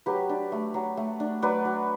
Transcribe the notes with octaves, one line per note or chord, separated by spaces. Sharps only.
F#3 G4 B4
D4
A3
F#3
A3
D4
F#3 B4 D5
F#3